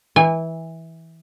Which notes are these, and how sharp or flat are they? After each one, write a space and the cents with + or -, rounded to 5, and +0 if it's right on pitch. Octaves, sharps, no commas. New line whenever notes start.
E3 -15 G#5 -30